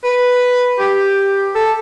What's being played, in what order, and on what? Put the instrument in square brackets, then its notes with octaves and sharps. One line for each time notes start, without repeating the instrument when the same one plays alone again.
[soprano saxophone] B4
G4
A4